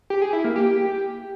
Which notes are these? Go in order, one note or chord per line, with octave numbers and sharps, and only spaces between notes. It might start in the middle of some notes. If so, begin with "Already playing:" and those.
G4
G#4
E4
A#3
G4